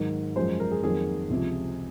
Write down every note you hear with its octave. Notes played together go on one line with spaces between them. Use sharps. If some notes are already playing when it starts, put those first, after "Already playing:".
Already playing: G#2 D#3 F#3
F#2 F3 G#3 C5
A#4
G#4
F2 D#3 F#3 A#3 G#4
C#2 C3 F3